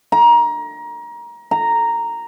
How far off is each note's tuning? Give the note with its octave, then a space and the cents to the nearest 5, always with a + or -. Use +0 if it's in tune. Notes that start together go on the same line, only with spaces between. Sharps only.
A#5 +25
A#5 -5